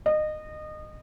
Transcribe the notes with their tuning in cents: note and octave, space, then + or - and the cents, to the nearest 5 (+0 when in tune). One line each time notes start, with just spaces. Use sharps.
D#5 -25